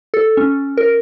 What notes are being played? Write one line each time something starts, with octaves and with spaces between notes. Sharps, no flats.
A4
C#4
A#4